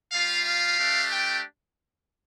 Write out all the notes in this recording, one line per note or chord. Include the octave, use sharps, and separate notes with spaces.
G3 F4 F5
F5
A3 D4 G4
G5